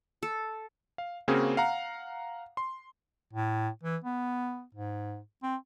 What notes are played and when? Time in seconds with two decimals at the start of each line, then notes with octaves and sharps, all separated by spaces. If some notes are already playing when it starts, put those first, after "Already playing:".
0.23 A4
0.98 F5
1.28 C#3 A#3 C4 C#4 F#4 G#4
1.57 F5 F#5 A#5
2.57 C6
3.33 A2
3.83 E3
4.04 B3
4.75 G#2
5.43 C4